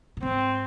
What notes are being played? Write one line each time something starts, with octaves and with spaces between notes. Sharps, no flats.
A#2
G#2 C4